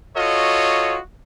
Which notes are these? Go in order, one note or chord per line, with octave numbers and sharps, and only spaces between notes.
F4 F#4 A4 C#5 D#5